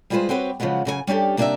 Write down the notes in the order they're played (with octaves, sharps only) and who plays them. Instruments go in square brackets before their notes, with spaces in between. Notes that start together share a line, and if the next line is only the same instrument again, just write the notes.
[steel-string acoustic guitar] G3 G#3 F4 G#4 B4 C5
C4 F#4 G4 B4 C#5
C#3 F3 F#3 G#3 B3
F#2 C#3 G#4 G#5
G3 C#4 D4 G4 A4
C3 A#3 D4 D#4 D5 E5